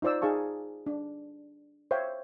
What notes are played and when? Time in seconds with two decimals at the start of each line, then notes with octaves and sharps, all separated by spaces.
0.02 D#4 F4 C5 D5 E6
0.22 D#4 G#4 F5 A5 C#6
0.86 D4
1.91 C5 C#5 E5 F5 G5